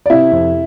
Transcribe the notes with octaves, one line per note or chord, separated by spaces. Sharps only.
D5
C3 E4 E5
F2